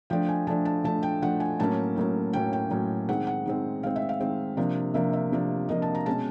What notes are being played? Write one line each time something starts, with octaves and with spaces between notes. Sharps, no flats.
F3 A3 D4 G5
G#5
F3 A3 D4 A5
A5
F3 A3 D4 A5
G5
F3 A3 D4 F#5
G#5
A2 F#3 A#3 C#4 A5
A2 F#3 A#3 C#4
A2 F#3 A#3 C#4 G5
G5
A2 F#3 A#3 C#4
D#3 G#3 C4 F#5
F#5
D#3 G#3 C4
D#3 G#3 C4 F5
E5
F5
D#3 G#3 C4
C3 F3 A#3 D4
C3 F3 A#3 D4 E5
E5
C3 F3 A#3 D4
C3 F3 A#3 D4 D#5
A5
A#5
B2 G#3 C#4 A5